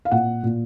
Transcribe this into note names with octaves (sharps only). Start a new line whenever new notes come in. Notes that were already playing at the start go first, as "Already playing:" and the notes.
F5
A#2 F#5
A#2